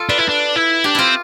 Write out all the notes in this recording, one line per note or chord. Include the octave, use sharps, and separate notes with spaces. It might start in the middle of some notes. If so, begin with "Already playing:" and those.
Already playing: F4 A4
D4 B4
E4
D4
E4
D4 G4
C4 E4 F4